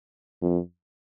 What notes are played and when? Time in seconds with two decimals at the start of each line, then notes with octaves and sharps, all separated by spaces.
0.42 F2